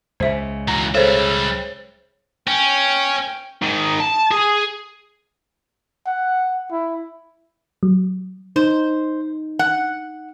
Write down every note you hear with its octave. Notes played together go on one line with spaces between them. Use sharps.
C#2 C#3 C5 E5
E3 F#4 A#5
G3 G#4 A4 C5 C#5 E5
C#4 G5
G#2 D#3
A5
G#4
F#5
E4
F#3
D#4 C5
F#5